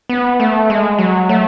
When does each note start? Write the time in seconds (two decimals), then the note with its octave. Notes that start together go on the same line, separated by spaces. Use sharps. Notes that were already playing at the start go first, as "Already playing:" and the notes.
0.09 B3
0.40 A3
0.70 G#3
0.99 F#3
1.29 A3